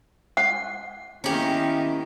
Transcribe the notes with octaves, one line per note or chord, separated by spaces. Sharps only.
F#5
D#3 A#3 B3 C#4 E4 G4